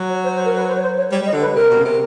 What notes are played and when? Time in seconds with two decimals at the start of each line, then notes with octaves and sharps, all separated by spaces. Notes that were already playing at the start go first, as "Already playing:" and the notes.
Already playing: F#3
0.09 C#5
0.24 C5
0.35 C5
0.45 A#4
0.57 B4
0.68 C5
0.76 C#5
0.83 C5
0.97 C#5
1.11 G3 C#5
1.23 G3 D#5
1.34 D3
1.41 B4
1.55 C3 A#4
1.70 B2
1.79 C#3
1.85 C3